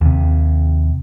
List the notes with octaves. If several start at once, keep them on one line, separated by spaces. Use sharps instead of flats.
D#2 C3